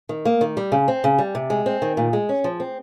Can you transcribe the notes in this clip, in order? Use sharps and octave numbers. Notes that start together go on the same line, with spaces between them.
D#3
A#3
D#3
G3
C#3
C4
C#3
G3
C3
G#3
C4
D#3
A#2
G#3
C#4
F3
C4